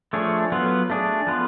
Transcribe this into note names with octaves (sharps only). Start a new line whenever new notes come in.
F3 A3 D4 G#4 C#5
F#3 B3 F4 B4
A3 D4 G#4
F3 B3 F4 B4